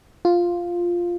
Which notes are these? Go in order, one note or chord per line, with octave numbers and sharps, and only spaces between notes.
F4